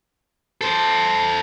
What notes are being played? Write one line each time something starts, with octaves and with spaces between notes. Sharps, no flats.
A4 C5